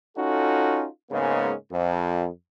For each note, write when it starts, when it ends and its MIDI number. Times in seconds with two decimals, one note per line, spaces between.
0.17 0.87 61
0.17 0.87 63
0.17 0.87 65
0.17 0.87 66
0.17 0.87 69
1.12 1.54 44
1.12 1.54 49
1.12 1.54 56
1.12 1.54 58
1.12 1.54 59
1.12 1.54 61
1.72 2.28 41